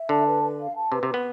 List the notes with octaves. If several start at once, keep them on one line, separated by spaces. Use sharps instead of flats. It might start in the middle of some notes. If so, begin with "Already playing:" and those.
Already playing: E5
D3 A5
B4
B4
F5
A5
C3 B4
C3
B3 B4